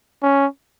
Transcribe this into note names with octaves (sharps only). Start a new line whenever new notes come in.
C#4